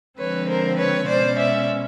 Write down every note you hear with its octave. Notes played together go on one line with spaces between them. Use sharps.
D3 F3 G#3 C4 B4 C#5
A#4 C5
B4 C#5
B2 G#3 C#4 C5 D5
D5 E5